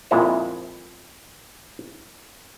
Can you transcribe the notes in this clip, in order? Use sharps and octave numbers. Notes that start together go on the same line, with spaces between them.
F2 A#2 G#3 E4 C5